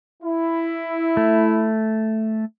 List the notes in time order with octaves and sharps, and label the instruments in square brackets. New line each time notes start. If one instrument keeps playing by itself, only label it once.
[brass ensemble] E4
[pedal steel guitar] A3